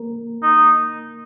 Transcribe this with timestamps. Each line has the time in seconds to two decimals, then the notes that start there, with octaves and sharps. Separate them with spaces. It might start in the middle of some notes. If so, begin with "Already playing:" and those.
Already playing: A#3 A#4
0.43 D#4